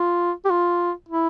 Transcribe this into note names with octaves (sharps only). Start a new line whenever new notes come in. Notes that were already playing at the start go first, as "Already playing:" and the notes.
Already playing: F4
G4
F4
E4